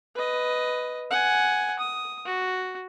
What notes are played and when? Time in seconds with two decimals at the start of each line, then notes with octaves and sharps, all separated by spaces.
0.15 B4 D#5
1.11 F#5 G#5
1.79 D#6
2.26 F#4